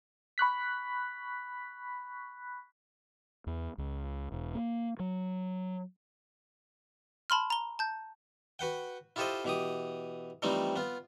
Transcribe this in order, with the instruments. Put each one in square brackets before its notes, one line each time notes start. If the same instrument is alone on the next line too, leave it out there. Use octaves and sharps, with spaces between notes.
[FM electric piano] B5 C#6 F#6 B6
[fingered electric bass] E2
C#2
E1
A#3
F#3
[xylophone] A5 B5 C6 F6
A#5 G7
A5 G6
[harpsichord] F#4 B4 F#5 G5
E4 F4 G4 A4 C5 D#5
B2 E3 G4 D#6
E3 F3 G3 A3 C4 D#4
B3 F4